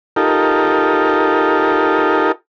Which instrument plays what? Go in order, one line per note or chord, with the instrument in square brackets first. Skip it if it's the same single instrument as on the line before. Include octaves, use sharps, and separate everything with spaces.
[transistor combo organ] D#4 F4 G4 A4 A#4